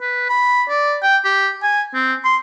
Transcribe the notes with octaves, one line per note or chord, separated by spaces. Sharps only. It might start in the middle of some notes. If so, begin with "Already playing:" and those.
B4
B5
D5
G5
G4
G#5
C4
C6